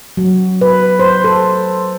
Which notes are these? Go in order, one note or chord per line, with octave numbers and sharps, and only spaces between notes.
F#3
B4
C5
A4